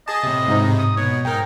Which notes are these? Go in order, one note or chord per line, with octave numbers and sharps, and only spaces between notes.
G#4 D#5 A5
A2 C3
G#2 D#4
D#6
B2 C#5
G#2 D#4 A#4 G5